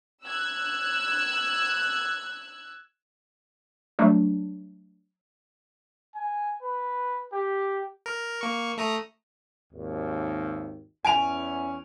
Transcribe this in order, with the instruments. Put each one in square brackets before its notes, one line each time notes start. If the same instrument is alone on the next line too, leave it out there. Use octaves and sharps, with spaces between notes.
[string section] E6 F#6 G#6
[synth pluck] F#3 G3 A3 D4
[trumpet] G#5
B4
G4
[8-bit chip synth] A#4
A#3 C#6
A3 A#5 D#6
[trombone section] G#1 D#2
[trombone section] E2 C#4 [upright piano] G#5 D7 F7